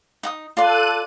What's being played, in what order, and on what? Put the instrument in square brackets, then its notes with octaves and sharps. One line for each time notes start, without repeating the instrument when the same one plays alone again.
[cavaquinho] D#4 F#5 D#6
[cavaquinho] F4 D5 C6 [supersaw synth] A4 F#6 D#7